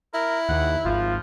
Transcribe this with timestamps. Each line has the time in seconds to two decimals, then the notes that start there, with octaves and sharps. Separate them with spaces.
0.14 E4 A#4
0.49 D#2 F#5
0.85 G#1 F3 F4